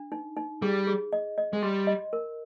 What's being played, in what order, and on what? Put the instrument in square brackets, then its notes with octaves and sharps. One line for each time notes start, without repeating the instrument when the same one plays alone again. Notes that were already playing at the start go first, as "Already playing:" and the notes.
Already playing: [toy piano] D4
D#4
D#4
[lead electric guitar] G3 [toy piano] G#4
[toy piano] G#4
D#5
D#5
[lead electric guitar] G#3
[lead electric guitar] G3 [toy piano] C6
[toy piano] D#5
A#4